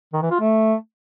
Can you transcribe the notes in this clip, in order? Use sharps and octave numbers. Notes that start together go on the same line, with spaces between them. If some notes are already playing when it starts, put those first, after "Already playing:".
D#3
E3
F4
A3